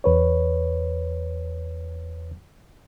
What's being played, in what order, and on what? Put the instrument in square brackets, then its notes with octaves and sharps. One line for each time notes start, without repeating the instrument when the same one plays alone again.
[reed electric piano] E2 B4 C#5